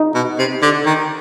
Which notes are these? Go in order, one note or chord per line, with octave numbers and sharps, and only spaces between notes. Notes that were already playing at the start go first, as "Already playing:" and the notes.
Already playing: D#4
B2
C3
D3
D#3